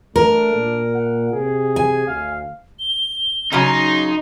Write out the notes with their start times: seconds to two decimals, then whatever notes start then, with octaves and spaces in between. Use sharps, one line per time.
0.16 A3 D4 A#4
0.54 A#2
0.94 F#5
1.32 C3 G#4
1.76 G#5
2.07 D2 F5
2.79 G7
3.53 C#3 F#3 D#4 C6